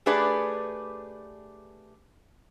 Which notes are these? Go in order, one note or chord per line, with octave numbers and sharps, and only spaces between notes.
A3 D4 G4 G#4 B4 D5